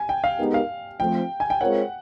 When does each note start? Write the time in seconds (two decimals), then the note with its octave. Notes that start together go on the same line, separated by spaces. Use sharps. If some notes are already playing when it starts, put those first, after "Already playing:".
Already playing: G#5
0.09 G5
0.24 F5
0.39 G#3 B3 D#4 G4 A#4
0.54 F5
1.00 F3 A3 C4 G5
1.40 G#5
1.50 G5
1.61 G#3 C4 F4 A#4 C#5 F#5